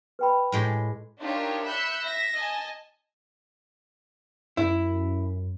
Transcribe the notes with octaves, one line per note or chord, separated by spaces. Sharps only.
B4 G5 B5
A2 G#3 G4
D4 D#4 F4 G4 A#4 C#5
E5 B5 E6 F#6 G6 C#7
E5 A#6
D#5 G#5 A5
F#2 E4